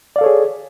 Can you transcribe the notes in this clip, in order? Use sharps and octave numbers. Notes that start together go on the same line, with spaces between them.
G#4 A4 C#5 D5 F5